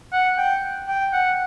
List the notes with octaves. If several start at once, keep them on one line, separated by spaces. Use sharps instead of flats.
F#5
G5
G5
F#5